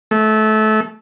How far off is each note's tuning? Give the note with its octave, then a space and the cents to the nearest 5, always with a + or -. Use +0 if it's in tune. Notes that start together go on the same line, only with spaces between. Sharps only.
A3 -25